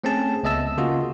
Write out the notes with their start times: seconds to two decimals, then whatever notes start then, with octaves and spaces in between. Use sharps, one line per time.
0.04 A3 C4 C#4 G#4 A5
0.43 C#2 B3 D#5 E5 A5 E6
0.77 C#3 A#3 F4 F#4 D#5